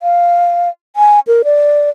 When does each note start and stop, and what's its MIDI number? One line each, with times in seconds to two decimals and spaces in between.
0.02 0.69 77
0.96 1.20 80
1.27 1.42 70
1.44 1.90 74